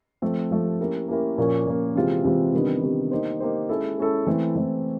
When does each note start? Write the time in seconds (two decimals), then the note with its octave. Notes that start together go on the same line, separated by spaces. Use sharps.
0.22 F3 A3 C4
0.51 F3 A3 C4
0.80 A#3 C#4 E4 G4 A#4
1.08 A#3 C#4 E4 G4 A#4
1.38 A#2 F3 A#3 C#4
1.67 A#2 F3 A#3 C#4
1.96 C3 E3 G#3 C4 F4
2.24 C3 E3 G#3 C4 F4
2.53 C3 D#3 G3 B3 D4
2.82 C3 D#3 G3 B3 D4
3.11 A#3 D#4 G4 C5
3.40 A#3 D#4 G4 C5
3.69 G#3 C#4 E4 A4
3.98 G#3 C#4 E4 A4
4.27 E3 A3 C4 E4
4.56 E3 A3 C4 E4